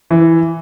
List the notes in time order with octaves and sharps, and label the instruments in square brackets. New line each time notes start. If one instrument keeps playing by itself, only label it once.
[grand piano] E3